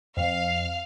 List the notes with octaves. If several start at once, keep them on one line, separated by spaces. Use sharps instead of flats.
F2 F5